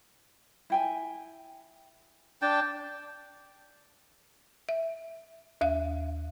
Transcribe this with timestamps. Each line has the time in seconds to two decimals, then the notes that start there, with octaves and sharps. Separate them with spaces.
0.70 E4 G5 G#5
2.42 D4 G5 A5
4.69 E5
5.61 D#2 E5 F5